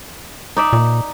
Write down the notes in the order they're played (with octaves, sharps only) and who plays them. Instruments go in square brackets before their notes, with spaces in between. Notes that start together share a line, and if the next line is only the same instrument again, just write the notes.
[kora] D#4 D5 E5
[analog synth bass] A#2